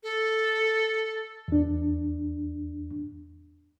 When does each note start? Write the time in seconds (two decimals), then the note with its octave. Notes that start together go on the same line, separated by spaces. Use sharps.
0.03 A4
1.48 E2 D4